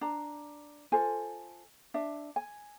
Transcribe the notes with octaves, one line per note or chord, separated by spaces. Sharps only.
D4 A#5
F4 A4 C5 G#5
D4 E5
G#5